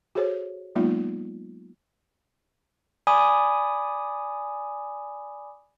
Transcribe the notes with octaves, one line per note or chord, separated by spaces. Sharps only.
F#4 G#4 A4 C5 C#5
F#3 G#3 A#3 B3 D#4 F4
D5 G#5 B5 D6 D#6